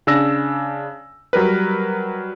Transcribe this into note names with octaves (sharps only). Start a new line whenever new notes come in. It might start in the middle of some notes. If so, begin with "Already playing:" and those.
C#3 D4 E6 A#6
F#3 G3 A#4 B4